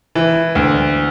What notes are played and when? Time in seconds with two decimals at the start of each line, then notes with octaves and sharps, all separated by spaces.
0.15 E3
0.55 D2